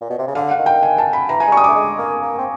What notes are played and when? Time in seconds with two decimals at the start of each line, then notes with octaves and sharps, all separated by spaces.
0.01 A#2
0.10 B2
0.18 C3
0.27 C#3
0.35 D3 F5
0.51 F#5
0.59 D#3
0.66 G5
0.83 G#5
0.98 A5
1.13 B5
1.29 E3 A#5
1.40 G#5
1.47 G#3
1.52 G3 C#6
1.57 D#6
1.64 A3 D6
1.75 G#3
1.98 A#3
2.22 A#3
2.38 C4